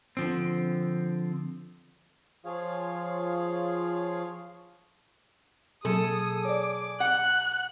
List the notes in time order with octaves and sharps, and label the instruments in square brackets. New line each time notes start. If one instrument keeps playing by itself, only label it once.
[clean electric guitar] D3 F3 C4
[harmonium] F3 F4 G#4 C#5 F5
[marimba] B2 F#3 A#3 [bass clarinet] G#4 [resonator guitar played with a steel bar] A4 [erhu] D#6
[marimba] C#5 D5 [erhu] D6
[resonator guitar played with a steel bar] F#5 [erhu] F#6